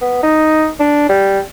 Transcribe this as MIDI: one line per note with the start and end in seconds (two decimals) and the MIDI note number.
0.01 0.20 59
0.23 0.68 63
0.80 1.08 62
1.09 1.40 55